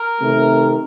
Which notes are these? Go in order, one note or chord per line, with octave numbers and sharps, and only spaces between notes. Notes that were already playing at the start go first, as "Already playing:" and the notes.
Already playing: A#4
C3 D#3 A3